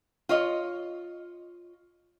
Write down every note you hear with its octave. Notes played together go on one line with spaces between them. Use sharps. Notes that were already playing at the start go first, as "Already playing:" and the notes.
F4 C#5 D#5